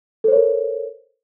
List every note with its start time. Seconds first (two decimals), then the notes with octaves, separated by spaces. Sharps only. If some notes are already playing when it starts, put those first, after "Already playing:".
0.24 A4
0.28 C5
0.32 C#5
0.36 A#4